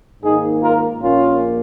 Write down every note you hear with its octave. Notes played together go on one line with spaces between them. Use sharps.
G#2 D#3 A#3 D#4 G#4
F4 A#4
A#1 A#2 A#3 C#4 F4